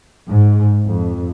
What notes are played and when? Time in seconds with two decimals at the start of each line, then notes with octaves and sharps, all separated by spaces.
0.29 G#2
0.86 F2